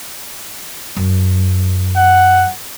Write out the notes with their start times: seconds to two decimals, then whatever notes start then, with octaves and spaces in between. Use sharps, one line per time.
0.97 F#2
1.96 F#5